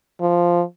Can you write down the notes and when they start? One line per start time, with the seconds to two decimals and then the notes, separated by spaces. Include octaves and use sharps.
0.21 F3